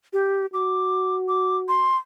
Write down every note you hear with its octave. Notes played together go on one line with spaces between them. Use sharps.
G4
F#4 D6
D6
C6